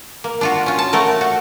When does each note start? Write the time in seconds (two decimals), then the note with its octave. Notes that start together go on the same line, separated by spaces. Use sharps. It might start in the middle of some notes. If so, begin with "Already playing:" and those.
0.24 A#3
0.41 D4 F4 F#4
0.66 C#4 F4
0.79 A5
0.93 A3 F#4 A#4
1.21 F#4